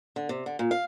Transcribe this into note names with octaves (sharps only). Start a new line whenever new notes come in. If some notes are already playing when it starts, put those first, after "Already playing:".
D3
C3
D3
A#2
F5